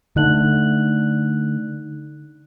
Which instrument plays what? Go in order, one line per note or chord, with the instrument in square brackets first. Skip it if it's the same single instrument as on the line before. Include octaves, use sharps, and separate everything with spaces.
[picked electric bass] D3 A3 [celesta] D#4 F#6 F#7